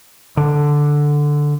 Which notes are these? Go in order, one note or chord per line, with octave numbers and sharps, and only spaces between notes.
D3